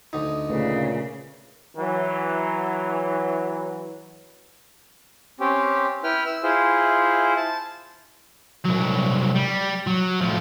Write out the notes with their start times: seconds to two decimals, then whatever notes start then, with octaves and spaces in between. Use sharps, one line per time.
0.13 D2 D#4
0.50 A#2 C#3 A3 B4 C#5
1.76 E3 F#3
5.40 C4 C#4 G4
6.04 E4 B4 G5 F6
6.26 E6
6.43 E4 F4 G#4 C5
7.37 A5
8.65 C2 F#3
9.35 G3
9.87 F#3
10.21 A2 F3